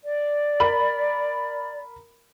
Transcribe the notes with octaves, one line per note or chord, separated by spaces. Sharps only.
D5
A#4 B5 F#7